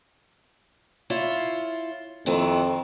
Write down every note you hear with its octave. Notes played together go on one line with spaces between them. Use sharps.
E4 F4 C#5
F2 D#3 C4 E4